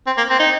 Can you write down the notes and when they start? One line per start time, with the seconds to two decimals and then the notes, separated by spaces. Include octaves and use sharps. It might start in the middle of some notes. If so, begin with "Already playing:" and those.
0.07 C4
0.18 A#3
0.30 C4
0.40 D#4